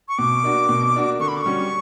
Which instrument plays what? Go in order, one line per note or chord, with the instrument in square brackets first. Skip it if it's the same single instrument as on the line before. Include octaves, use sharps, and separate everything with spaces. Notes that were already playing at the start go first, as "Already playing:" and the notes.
[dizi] C#6
[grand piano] B2 [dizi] D6
[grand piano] A#3 D4 F#4
B2
A#3 D4 F#4
[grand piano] D3 [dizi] C#6
[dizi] B5
D6
C#6
[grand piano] G3 C#4 F#4